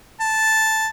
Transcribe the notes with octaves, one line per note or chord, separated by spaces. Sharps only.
A5